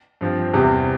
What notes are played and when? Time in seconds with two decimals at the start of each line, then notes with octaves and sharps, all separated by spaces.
0.21 G2 F3 C4
0.53 E2 C3 G3 C4